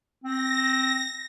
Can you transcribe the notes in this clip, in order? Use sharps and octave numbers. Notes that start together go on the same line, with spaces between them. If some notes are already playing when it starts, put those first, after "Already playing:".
C4 A#6